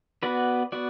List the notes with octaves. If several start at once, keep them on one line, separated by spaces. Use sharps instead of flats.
B3 F#4 B4 D5
B3 F#4 D5